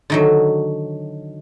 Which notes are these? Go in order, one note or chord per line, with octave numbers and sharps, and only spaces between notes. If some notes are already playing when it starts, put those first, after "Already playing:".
D3 D#3 F#3